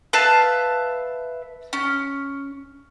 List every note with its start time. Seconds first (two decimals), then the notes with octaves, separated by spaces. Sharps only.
0.13 B4 E5 F5 A5
1.73 C#4